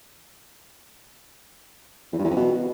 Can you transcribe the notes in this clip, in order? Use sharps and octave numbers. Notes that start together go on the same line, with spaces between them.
E2
G2
E2
F2
B2